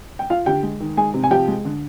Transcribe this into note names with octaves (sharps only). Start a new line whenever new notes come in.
G5
F4 F5
D3 G4 G5
G#3
D#3
G#3 G#4 G#5
C3
G#5
F3 G4 G5
G#3
D3